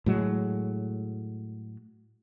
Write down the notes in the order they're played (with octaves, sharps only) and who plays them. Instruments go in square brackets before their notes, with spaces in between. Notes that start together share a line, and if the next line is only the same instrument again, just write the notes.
[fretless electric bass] A2 F#3 G#3